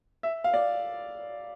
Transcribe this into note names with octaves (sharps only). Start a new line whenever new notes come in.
E5
F5
D5